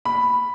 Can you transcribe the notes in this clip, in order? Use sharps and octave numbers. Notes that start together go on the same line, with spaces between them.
B5